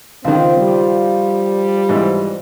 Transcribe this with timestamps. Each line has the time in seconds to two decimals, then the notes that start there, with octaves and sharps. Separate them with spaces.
0.24 C#2 D#3 F3 C4
0.57 G3
1.89 G#2 E3 C4